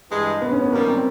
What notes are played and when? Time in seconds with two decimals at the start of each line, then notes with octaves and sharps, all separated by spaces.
0.10 G2 E3 G#3
0.42 B3
0.52 C#4
0.62 B3
0.72 F#2 D#3 G3 A#3
0.88 C4